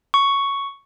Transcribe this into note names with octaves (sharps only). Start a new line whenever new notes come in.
C#6